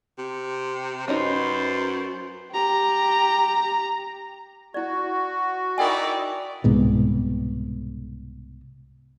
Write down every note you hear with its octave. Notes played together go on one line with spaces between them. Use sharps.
C3
F#2 C#4 D#4 B4 C5
G4 A#5
E4 F#4 D5
D#4 E4 A#4 D5 G5 G#5
C2 G#2 B2